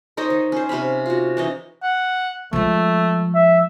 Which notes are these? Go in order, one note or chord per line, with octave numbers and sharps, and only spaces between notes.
D#4 C5 C#5 D#5
D#3
C#4 C5
C3 C#4 F5 B5
F4 F#4
E3 C#4 D#4
F#5
F3 G#3 A3
E5